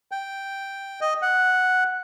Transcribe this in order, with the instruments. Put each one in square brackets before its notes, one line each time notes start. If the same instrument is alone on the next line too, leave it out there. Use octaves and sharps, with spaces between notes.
[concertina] G5
D#5
F#5